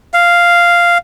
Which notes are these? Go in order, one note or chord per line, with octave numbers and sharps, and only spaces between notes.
F5